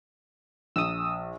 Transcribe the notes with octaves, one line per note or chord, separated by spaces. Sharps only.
A#1 D#6 E6